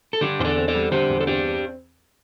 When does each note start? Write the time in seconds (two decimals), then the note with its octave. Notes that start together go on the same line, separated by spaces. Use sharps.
0.13 A4
0.21 D3 D4 G4
0.39 E2 C5
0.45 A4 D5
0.57 C4
0.68 A4 D5
0.75 G3
0.91 D3 G4 C5
1.09 E2
1.20 A4
1.27 C4 D4 G4